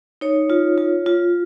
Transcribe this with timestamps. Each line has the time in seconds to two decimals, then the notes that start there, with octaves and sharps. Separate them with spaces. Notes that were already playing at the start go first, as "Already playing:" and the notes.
0.21 D#4 C#5
0.50 F4
0.78 F4
1.06 F4